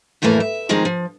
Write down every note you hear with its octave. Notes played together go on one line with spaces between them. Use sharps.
F2 A2 E3 A3 A#3 G#5
E5
D#3 F3 G#3 C4 D#4 G#4
F3